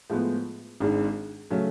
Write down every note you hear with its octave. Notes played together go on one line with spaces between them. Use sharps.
A2 F3 G#3 B3
G#1 G#2 G#3 D4 G#4
C#3 F#3 A3 C#4